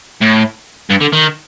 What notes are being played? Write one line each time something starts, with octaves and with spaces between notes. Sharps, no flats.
A2
G2
D3
D#3